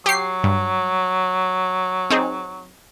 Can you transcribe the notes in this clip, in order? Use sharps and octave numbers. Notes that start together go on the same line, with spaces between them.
F#3 G4 C7
G2
C4 D#4 G#4